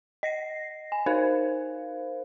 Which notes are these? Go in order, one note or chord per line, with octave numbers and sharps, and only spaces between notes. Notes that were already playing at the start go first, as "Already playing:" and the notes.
D#5 A#6 C7
G#5
D#4 A#4 C5 F5